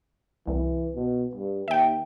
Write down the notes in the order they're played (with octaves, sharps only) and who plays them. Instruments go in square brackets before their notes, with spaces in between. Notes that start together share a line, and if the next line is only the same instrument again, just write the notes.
[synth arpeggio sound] C2 [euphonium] E3
[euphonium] B2
G2
[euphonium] D#2 [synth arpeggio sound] E5 G5